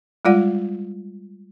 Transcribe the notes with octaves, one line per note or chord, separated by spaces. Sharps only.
G3 G#3 F4 D5 F#5